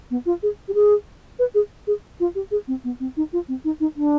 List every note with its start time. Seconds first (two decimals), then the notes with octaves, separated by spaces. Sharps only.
0.11 B3
0.26 F4
0.43 G#4
0.68 G4
0.74 G#4
1.39 B4
1.55 G#4
1.87 G#4
2.20 F4
2.35 G4
2.51 G#4
2.68 C4
2.84 B3
3.00 C4
3.17 D#4
3.33 F4
3.48 C4
3.64 D#4
3.80 D#4
3.96 D4